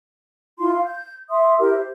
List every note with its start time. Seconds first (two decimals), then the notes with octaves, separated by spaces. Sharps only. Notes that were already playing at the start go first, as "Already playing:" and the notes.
0.59 E4 F4 C6
0.72 F5
0.85 G6
1.29 E5 C6 D#6
1.58 E4 G4 A#4 E5
1.73 C5